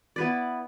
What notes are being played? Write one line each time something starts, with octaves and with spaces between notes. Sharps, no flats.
B3 E4 B4 D5